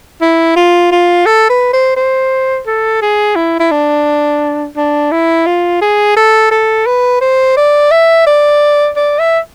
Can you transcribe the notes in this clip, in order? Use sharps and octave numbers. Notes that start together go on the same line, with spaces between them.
E4
F4
F4
A4
B4
C5
C5
A4
G#4
E4
E4
D4
D4
E4
F4
G#4
A4
A4
B4
C5
D5
E5
D5
D5
E5